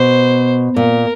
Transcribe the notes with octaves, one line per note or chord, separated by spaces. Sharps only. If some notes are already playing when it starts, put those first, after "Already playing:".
Already playing: B2 C5
A#2 A#4